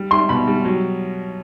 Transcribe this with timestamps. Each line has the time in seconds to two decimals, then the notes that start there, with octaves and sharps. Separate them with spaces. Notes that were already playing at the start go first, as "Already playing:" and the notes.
Already playing: G3
0.11 G3 C6
0.29 B2 B5
0.47 G3
0.65 F#3